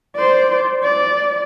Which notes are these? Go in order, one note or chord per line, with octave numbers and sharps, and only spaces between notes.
C5 D5
D5